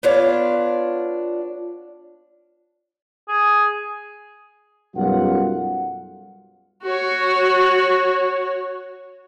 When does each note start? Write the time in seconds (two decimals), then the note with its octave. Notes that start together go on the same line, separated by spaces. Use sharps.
0.03 B3 D4 F4 C#5
3.28 G#4
4.96 B1 F#2 G3 F4 F#5
6.83 F#4 C#5